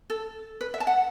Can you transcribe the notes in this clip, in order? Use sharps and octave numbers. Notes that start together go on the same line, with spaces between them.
A4
B4
E5
A5
F#5